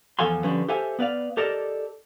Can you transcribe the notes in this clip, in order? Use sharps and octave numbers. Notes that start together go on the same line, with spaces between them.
E2 F3 A4 F5 G#5 C6
D3 F3 G3 C#4 B4
G4 A4 C5 E5 F5 G#5
B3 B4 D5 F5
G4 A4 A#4 D5 D#5 A5